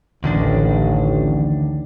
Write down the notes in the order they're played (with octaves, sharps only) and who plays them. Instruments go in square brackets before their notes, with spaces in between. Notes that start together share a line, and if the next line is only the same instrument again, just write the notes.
[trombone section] A1 [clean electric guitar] D2 D#3 D4